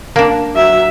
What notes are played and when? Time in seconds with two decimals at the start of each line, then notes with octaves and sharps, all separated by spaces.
0.16 A#3 D4
0.55 F#3 E5